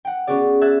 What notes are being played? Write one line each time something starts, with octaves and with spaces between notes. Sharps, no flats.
F#5 G5
B3 C#4 F#4 G#4 D5
E5 A5 E6 F#6 G#6 A6